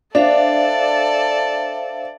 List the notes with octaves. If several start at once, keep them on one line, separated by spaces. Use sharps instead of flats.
D4 A4 C5 D5 E5 F5